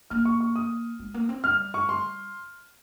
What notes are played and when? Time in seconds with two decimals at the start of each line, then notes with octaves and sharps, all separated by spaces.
0.10 A#3 F6
0.25 C#6
0.40 C#6
0.56 D#6
0.99 G#3
1.14 A#3
1.29 C4
1.44 G3 F6
1.74 C#6
1.89 C6